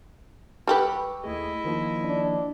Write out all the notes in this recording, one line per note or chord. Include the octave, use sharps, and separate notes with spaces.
G3 G4 B4 C#6 E6
D#2 A3 E4 G#4 D#5
D#3 F3 A#3
D4